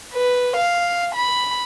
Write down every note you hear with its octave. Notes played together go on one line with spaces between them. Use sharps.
B4
F5
B5